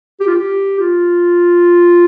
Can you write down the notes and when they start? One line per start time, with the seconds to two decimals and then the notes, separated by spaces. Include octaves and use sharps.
0.20 G4
0.27 F4
0.35 G4
0.80 F4